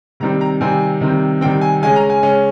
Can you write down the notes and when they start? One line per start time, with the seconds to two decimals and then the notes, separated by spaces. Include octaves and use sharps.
0.20 C3 D#3 G3 C4 A#5
0.41 A#5
0.61 C3 D#3 G3 C4 G#5
1.01 C3 D#3 G3 C4
1.41 C3 D#3 G3 C4 G5
1.61 G#5
1.82 C#3 G#3 C#4 G#5
1.96 A#5
2.10 G#5
2.23 C#3 G#3 C#4